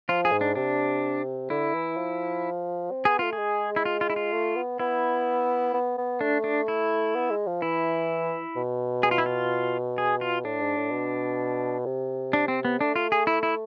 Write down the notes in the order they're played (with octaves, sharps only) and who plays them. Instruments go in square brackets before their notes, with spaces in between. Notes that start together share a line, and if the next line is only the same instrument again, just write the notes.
[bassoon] F3 [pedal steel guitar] F4
[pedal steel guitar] G#4
[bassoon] G#2
[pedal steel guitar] D4
[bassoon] C3 [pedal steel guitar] D4
[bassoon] D3 [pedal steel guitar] E4
[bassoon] E3
F3
C4
[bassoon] B3 [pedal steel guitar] G#4
[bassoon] A3 [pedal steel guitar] F4
[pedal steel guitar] G#4
[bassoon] G#3
[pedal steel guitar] E4
F4
F4
E4
F4
[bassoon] A3
B3
[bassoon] B3 [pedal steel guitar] E4
[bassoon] B3
B3
[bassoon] A3 [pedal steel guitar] D4
[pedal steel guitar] D4
E4
[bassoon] B3
G#3
F3
[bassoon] E3 [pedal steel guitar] E4
[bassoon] B2
[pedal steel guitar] G#4
F4
E4
F4
G#4
F4
[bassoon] A2 [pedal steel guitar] D4
[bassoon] G#2
A2
B2
C3
[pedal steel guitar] D4
C4
B3
[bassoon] A3 [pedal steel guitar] D4
[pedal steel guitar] F4
G#4
E4
E4